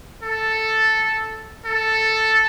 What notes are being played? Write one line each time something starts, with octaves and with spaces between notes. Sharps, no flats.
A4
A4